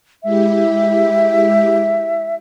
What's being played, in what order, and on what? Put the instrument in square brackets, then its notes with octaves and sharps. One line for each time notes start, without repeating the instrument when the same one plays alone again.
[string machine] G#3 E4 G4 [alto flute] E5